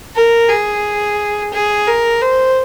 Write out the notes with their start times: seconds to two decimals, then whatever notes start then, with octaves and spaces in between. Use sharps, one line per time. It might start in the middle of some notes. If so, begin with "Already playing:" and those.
0.16 A#4
0.49 G#4
1.53 G#4
1.87 A#4
2.22 C5